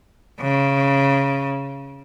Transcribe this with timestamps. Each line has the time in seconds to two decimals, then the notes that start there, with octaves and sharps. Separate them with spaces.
0.40 C#3